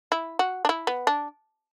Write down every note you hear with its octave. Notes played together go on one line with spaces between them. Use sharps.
E4
F#4
D4
E4
B3
D4